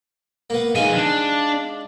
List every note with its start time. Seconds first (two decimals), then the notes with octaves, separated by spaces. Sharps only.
0.50 A#3 B3
0.75 F3 G#3 D#4 F4 G#5
0.96 D4